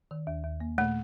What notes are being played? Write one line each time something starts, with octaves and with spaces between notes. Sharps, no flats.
D#3
D#2
D#2
A#3
A#2 A3